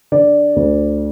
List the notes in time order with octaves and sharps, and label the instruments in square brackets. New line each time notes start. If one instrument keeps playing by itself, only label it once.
[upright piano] D3 D5
D2